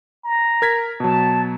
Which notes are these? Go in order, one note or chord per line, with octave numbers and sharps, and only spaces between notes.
A#5
A#4 G#6 B6
B2 F#3 A5